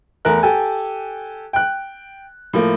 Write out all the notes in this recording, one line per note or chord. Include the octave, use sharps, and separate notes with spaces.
E2 A3 A#4 F#6
G4 A4 G#5
G5 F#6
A2 F3 A#3